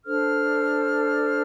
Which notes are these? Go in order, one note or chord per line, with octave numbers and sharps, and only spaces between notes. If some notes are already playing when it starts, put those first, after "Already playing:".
D4 A4 C5 F6